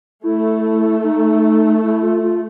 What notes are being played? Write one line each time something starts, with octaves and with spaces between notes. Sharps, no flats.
A3 E4
D#4
E4
F4
F4